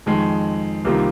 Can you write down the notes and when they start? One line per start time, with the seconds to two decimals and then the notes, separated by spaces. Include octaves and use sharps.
0.06 F2 D#3 G#3
0.85 C2 C3 D#3 A#3 F4